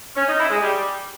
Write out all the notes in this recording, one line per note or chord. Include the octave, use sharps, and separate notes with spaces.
C#4
D#4
E4
G#3
G3